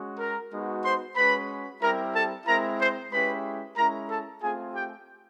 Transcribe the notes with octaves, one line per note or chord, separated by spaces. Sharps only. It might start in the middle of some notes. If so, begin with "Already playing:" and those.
Already playing: G#3 C#4 F#4
A#4 A#5
G#3 B3 D#4 F#4
C5 C6
G#3 C#4 F#4 B4 B5
G3 C4 E4 G4 A#4 A#5
A4 A5
G#3 C4 E4 A#4 A#5
C5 C6
G#3 C#4 E4 G4 B4 B5
G#3 C#4 E4 A#4 A#5
A4 A5
A3 C4 F4 G#4 G#5
G4 G5